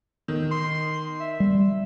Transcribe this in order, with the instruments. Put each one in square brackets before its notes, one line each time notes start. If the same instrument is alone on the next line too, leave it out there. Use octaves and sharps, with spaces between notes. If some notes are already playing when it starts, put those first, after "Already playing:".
[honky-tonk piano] D#3
[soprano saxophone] C6
E5
[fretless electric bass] G3